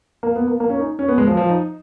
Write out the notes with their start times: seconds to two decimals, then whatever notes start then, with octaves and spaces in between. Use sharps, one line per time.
0.23 A#3
0.36 B3
0.47 A#3
0.60 A#3
0.70 C#4
0.80 D#4
0.99 C#4
1.08 B3
1.18 G#3
1.27 F3
1.37 F3
1.49 D#4